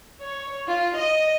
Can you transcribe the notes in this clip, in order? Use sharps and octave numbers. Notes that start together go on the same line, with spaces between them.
C#5
F4
D#5